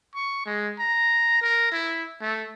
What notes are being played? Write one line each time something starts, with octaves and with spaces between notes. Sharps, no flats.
C#6
G#3
A#5
A#4
E4
A3